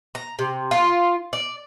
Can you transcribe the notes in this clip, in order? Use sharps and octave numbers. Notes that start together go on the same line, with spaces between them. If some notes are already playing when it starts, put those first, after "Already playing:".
A#5
C3
F4
D5